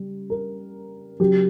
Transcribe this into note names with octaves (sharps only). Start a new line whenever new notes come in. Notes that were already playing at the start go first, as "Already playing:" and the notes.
Already playing: C#3 G3
A#4
C#3 F#3 G4